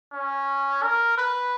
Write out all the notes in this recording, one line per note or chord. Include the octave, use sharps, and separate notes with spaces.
C#4
A#4
B4